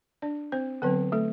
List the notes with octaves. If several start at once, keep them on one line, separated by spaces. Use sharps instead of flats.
D4 D5
C4 C5
D3 F#3 B3 C4 B4
A3 A4